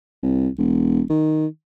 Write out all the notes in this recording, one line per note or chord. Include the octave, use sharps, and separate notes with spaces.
C2
E1
D#3